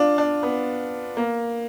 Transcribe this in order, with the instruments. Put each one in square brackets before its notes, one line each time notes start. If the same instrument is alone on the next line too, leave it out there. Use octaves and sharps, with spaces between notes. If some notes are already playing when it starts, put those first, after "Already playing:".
Already playing: [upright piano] D4 F4
D4
B3
A#3